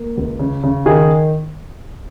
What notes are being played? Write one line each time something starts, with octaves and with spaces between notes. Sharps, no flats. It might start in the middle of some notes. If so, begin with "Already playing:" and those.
Already playing: A#3
C#2
C#3
C#3
D#3 G#4